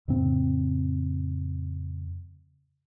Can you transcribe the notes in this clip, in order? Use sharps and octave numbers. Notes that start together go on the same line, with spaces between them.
F2 A2 C#3 C4